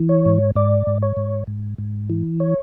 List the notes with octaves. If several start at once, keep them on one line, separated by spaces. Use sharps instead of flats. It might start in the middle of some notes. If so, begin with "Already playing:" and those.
Already playing: E3
C#5
G#2
G#2 D5
G#2
C#5
G#2
G#2
G#2
E3
C#5